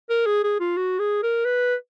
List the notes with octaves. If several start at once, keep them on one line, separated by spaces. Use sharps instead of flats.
A#4
G#4
G#4
F4
F#4
G#4
A#4
B4